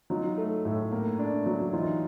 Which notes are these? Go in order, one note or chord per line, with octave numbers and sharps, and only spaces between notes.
F#3 D#4 F4
A3
A2
A#3
D4
F#3
E3 D#4 F4